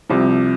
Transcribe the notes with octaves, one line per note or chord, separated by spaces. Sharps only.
C2 C3 F3